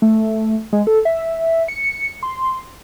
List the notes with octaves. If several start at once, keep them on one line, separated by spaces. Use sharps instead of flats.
A3
G#3
A4
E5
C#7
C6